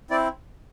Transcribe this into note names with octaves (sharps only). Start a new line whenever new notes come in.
C4 E4 D5